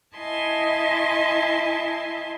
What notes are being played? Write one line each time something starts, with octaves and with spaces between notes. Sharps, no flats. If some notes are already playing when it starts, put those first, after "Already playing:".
E4 D#5 E5 G#5 A5 C6